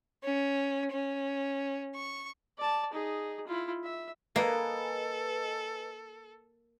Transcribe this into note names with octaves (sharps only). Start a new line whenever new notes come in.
C#4
C#4
C#6
D5 A5
D#4 G#4
E4 F4
E5
A#3 A4 B4 D#5 G#5